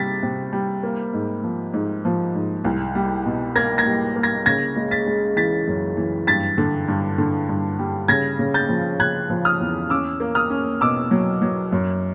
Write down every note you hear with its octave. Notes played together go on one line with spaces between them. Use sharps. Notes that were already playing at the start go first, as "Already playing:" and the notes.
Already playing: C3 G3 A6 B6
C3
G3
A#3
G#2
F3
G#2
F3
G#2
C2
G3
B2
A#3 G#6 A#6
G#6 A#6
G3
A#3
G#6 A#6
C#3 G#6 A#6
G#3
A6 B6
G#3
E3 A6 B6
F#2
E3
G2 A6 B6
D3
G2
D3
G2
G3
C#3 G#6 A#6
C#3
G6 A6
F3
C#3 F#6 G#6
F3
D#6 F6
E2
C#4 D6 E6
A#3
D#6 F6
C#4
B2 D6 E6
F#3
F#3
F#2